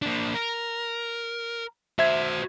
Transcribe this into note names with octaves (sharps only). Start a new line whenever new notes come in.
A#3 D4
A#4
F#4 C5 E5 G#6